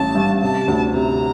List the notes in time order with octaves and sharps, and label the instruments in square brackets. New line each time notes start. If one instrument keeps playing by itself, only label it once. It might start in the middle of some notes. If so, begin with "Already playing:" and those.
Already playing: [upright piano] A1 G2 [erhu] A5
[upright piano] G2
[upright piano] C3 [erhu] A5
[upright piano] D2
[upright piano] C3 [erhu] A#5